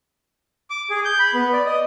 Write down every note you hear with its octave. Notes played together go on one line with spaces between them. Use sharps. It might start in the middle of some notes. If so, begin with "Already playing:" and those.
D6
G#4
G6
B5
B3
D5
D#5